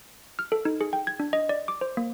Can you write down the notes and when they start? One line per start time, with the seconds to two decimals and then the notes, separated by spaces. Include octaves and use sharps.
0.39 F6
0.52 A4
0.65 D#4
0.81 G#4
0.93 G5
1.07 G#6
1.20 D4
1.33 D#5
1.49 D5
1.68 D6
1.81 C5
1.97 A#3